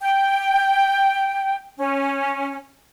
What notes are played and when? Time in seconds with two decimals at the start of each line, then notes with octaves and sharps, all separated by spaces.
0.01 G5
1.77 C#4